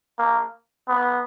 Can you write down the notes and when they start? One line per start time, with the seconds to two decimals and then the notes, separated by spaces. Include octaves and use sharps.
0.19 A#3
0.88 B3